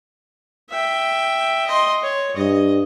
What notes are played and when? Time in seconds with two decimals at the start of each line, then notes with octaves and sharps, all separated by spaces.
0.70 E5 G5
1.67 D#5 C6
2.03 C#5
2.37 G2 D#5